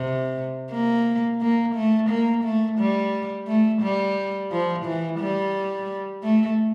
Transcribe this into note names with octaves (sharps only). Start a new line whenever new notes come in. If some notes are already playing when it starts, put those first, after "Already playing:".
Already playing: C3
A#3
A#3
A3
A#3
A3
G3
A3
G3
F3
E3
G3
A3